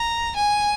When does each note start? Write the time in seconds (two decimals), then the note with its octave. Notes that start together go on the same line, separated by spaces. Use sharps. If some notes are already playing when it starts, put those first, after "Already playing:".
Already playing: A#5
0.36 G#5